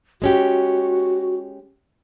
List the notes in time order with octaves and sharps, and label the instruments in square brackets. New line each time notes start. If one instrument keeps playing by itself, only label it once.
[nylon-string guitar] G#3 C#4 G4 [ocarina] F#4